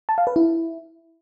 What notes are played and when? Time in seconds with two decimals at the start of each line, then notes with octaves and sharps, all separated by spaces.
0.09 A5
0.18 F5
0.27 B4
0.36 E4